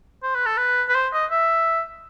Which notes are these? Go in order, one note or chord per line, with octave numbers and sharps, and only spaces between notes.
C5
B4
A4
B4
B4
C5
D#5
E5